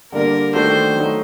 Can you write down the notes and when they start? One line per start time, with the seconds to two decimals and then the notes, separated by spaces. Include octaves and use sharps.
0.12 D3 G3 A#3 D4 A#4
0.54 D#3 A3 D4 F#4 A4 C5
0.96 F#3 A3 D#4